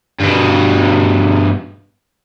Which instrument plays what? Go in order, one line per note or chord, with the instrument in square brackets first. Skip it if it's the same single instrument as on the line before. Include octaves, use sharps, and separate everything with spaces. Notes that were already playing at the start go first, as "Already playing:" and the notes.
[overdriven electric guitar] G2 B2